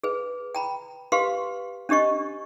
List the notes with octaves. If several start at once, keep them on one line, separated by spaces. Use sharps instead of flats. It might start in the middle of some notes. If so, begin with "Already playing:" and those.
G#4 B4
G5 A#5 B5
G4 B4 F5 C6
C#4 D4 G4 D#5 C#6